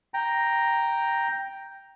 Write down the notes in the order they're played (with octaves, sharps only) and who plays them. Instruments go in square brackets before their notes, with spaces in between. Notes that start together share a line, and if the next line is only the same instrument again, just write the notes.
[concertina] G5 A#5